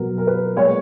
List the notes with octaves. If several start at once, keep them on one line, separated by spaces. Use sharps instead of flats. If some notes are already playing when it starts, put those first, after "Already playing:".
Already playing: B2 F#3 B3 A#4
A#4
B4
A#2 G#3 B3 C#5